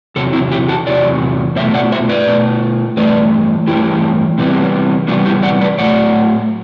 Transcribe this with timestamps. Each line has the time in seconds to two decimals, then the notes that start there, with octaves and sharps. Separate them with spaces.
0.16 E2 C3 F#3 A4
0.33 C4 E4
0.52 E4 G4
0.68 F#4 A4
0.87 E2 C3 F#3 D5
1.56 B2 C5 E5
1.60 A3
1.74 D5 F#5
1.92 C5 E5
2.09 B4 D5
2.27 B2 A3
2.97 G2 E3 A3 B4 D5
3.67 G2 E3 A3 E4 G4
4.38 C3 E3 G3 B3
5.08 C3 E3 G3 B3 D4 F#4
5.25 E4 G4
5.43 D5 F#5
5.61 B4 D5
5.78 A2 F#3 A3 D5 F#5